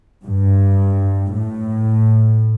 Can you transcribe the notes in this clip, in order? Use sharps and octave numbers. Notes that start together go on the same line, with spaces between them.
G2
A2